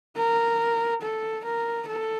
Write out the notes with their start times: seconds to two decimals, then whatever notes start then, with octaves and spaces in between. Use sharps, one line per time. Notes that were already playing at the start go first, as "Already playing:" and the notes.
0.16 A#4
1.01 A4
1.44 A#4
1.87 A4